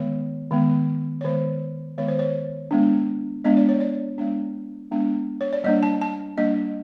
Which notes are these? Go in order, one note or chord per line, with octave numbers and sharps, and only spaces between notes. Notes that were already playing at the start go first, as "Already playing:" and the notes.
Already playing: D#3 G#3 B3 C#5
D#3 G#3 B3
C#5
D#3 G#3 B3 C5
D#3 G#3 B3 C#5
C5
C#5
G#3 B3 D4
G#3 B3 D4 D#5
D5
C#5
D5
G#3 B3 D4
G#3 B3 D4
C#5
D5
G3 A#3 D4 D#5
A5
A5
G3 A#3 D4 D#5